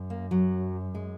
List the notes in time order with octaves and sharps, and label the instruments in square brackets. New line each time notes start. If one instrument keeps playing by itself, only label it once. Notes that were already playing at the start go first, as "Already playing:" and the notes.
Already playing: [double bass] F#2
[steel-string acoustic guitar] A#3
F#3
G#3